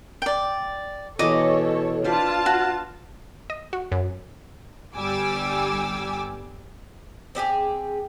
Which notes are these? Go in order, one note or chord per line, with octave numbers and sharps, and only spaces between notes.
D5 G5
B2 E3 F#4 A4 C#5 D#5 D6
D4 F4 B4 C5 A5
F#4
D#5
F#4
F#2
G1 G3 G#5 D6 E6
C4 D4 G4 G#4